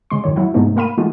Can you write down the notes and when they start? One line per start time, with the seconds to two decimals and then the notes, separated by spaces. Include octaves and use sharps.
0.10 C#3 G#3 C6
0.24 F#2 A2 D#3 C#5
0.36 F#3 E4 F#5
0.54 G#2 C3 G#3 A3 B3 D#4
0.76 A#3 A#4 F5 B5 D#7
0.98 E3 G#3 A3 D#4 F4 F#4